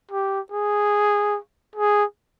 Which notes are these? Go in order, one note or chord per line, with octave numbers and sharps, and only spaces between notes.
G4
G#4
G#4